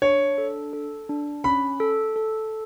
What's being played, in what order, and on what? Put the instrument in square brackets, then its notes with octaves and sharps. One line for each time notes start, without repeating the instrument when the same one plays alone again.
[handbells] D4 [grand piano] C#5
[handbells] A4
A4
D4
[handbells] C#4 [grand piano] B5
[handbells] A4
A4